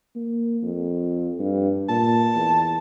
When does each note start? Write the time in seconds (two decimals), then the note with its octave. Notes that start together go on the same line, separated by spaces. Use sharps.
0.15 A#3
0.63 F2
1.39 G2
1.89 A#2 A5
2.35 E2